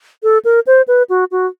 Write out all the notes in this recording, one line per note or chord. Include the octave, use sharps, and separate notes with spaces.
A4
A#4
C5
B4
F#4
F#4